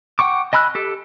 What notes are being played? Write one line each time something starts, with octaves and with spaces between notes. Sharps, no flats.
F#5 G5 C#6 D6
D#5 G#5 B5 E6 F#6
G4 A4